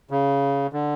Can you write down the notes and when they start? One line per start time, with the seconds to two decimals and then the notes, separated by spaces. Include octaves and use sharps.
0.10 C#3
0.73 D3